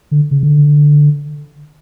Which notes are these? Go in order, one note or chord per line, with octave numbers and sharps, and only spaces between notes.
D3
C#3
D3